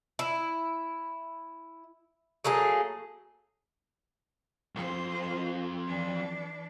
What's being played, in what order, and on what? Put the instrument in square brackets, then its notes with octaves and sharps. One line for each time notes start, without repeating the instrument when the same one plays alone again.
[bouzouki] E4
F#3 A3 A#3 G#4
[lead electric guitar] C2 F2 [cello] C5
[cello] E3 D4